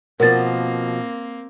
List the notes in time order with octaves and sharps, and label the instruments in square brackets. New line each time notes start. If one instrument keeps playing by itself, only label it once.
[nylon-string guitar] B2 F3 [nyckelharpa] A#3 C4 [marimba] A#4 A6